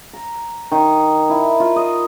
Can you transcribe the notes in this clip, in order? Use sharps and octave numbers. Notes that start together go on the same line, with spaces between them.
A#5
D#3
E4
F4
D#5